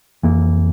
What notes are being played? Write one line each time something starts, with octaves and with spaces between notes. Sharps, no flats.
F2 E3 A#3